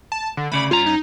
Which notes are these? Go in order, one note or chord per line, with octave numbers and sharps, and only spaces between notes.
A5
D3
D2 C#3 D5 B5
G2 C#4 F4 A#5
D#4